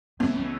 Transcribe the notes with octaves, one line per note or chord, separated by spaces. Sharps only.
C#2 C#3 E3 A3 B3 C#4
B3